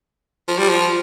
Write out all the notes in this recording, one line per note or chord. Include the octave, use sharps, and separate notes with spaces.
F3
G3
F3